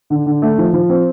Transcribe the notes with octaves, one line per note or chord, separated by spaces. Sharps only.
D3
D3
A3
F3
F3
C4